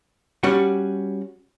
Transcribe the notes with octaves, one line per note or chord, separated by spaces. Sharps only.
G3 C#4 F#4 F#5